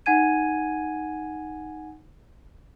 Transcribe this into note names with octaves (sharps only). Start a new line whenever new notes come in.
D#4 F#5 G#5 G#6 D#7